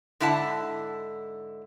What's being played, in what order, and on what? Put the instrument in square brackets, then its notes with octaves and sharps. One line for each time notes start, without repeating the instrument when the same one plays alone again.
[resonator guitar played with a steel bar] G#2 D3 E4 F#5 A5